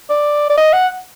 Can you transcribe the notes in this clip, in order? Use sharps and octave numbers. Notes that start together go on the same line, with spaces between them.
D5
D5
D#5
F#5